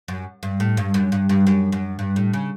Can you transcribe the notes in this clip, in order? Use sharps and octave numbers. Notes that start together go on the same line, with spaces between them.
F#2
G2
A2
G2
F#2
G2
G2
F#2
F#2
G2
A2
C#3